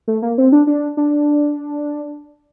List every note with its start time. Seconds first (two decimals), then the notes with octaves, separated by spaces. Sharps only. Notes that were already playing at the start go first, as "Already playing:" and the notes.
0.07 A3
0.22 A#3
0.38 C4
0.52 D4
0.67 D4
0.97 D4